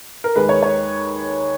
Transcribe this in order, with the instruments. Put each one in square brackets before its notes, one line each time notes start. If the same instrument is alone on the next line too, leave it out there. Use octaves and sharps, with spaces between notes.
[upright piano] A#4
D#2 D#3 G#3 B4
C#5
C#5